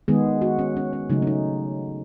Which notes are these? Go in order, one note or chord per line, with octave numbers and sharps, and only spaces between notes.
D#3 G#3 B3 G#4
F#4
C#4
C#4
C#4
C#3 F#3 A3 D#4
C#4
D#4